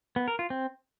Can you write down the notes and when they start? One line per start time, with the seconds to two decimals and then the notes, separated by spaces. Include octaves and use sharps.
0.16 B3
0.28 A#4
0.39 F4
0.50 C4